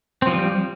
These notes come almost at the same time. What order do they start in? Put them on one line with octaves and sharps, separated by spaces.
C4 F3 G3